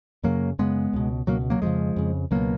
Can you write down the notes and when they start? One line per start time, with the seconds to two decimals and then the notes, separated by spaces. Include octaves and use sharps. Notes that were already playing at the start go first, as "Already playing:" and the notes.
0.23 F#2 C#3 F#3 A#3
0.59 F#2 C#3 G#3 B3
0.93 C#2 B2
1.27 C#2 B2 F#3 A#3
1.50 F#3 A#3
1.62 F2 C#3 F3 G#3
1.96 F2 C#3
2.31 C#2 B2 F#3 A#3